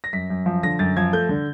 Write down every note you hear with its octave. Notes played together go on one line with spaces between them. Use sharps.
A#6
F#2 B6
F#2
F3
D3 A#6
F#2 A6
F3 G#6
A3 G6
D3